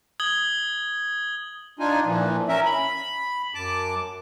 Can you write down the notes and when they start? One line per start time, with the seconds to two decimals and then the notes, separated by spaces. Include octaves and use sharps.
0.20 D#6 G#6 F#7 G7
1.79 D4 D#4 F4 G#5
2.05 A#2 E3 F3
2.49 C#4 A#4 E5
2.66 B5
3.54 F#2 A5 D6